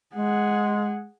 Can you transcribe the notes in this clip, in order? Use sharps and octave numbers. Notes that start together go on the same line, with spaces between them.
G#3 G#4 F#5